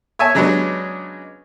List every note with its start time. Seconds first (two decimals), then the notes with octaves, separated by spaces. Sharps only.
0.19 C#5 E5 G#5 A5
0.35 C#3 F#3 G#3 B3 C#4 D4